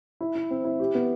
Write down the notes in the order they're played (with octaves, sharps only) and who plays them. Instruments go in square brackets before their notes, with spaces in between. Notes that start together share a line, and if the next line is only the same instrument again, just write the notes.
[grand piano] E4
E4
C4
E4
G4
B3